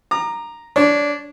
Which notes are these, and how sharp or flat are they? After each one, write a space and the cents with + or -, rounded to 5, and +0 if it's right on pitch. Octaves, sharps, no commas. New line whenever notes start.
A#5 +0 D6 +45
D4 -15 C#5 -5